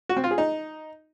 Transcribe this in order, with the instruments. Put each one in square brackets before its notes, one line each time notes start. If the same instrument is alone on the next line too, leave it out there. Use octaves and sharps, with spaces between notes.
[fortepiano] F#4
C4
F4
G#4
D#4